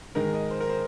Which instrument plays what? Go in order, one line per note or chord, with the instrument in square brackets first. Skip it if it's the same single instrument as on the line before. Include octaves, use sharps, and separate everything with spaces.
[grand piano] G#2 D#3 G#3 A#4
D#5
C5
A#4
C5